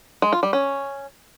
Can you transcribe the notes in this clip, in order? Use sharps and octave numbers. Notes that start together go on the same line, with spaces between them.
G#3
F4
G3
C#4